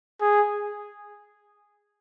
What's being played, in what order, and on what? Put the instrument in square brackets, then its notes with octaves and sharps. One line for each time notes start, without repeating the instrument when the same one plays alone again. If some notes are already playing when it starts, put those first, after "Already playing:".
[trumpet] G#4